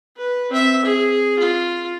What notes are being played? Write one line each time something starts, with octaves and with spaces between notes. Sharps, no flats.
B4
C4 E5
G#4
F4